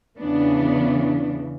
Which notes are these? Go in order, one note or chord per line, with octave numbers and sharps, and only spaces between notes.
E2 C#3 E3 B3 D4